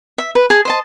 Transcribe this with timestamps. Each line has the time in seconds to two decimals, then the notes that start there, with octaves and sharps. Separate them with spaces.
0.18 E5
0.35 B4
0.50 G#4 A5
0.65 C5 D#5 A5